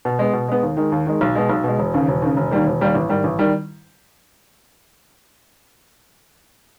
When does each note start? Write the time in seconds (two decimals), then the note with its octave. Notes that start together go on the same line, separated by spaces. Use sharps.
0.05 B2
0.19 G#3 B3
0.33 B2
0.48 G#3 B3
0.63 D#2
0.77 D#3 G#3
0.92 D#2
1.06 D#3 G#3
1.21 B1
1.35 B2 G#3
1.50 B1
1.64 B2 G#3
1.79 E1
1.94 D#2 C#3
2.08 E1
2.22 D#2 C#3
2.37 E1
2.51 D#2 D#3 G3 A#3
2.67 E1
2.81 D#2 D#3 G3 A#3
2.95 A1
3.09 G#2 D#3 G3
3.24 A1
3.39 D#3 G3